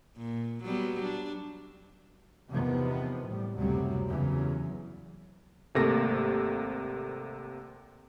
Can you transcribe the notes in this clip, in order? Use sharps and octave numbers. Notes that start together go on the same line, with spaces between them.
A#2
F#3 G3 B3
D4
E2 C3 D#3 F3 B3
A2 G3
F#1 D2 C3 F#3 G3
E2 C#3 E3 F#3
G#1 C3 A3 A#3 A4 A#6